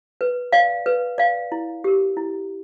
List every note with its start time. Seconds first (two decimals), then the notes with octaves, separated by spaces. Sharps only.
0.21 B4
0.52 D5 F5
0.86 B4
1.18 D5 F5
1.52 E4
1.84 G4 A#4
2.17 E4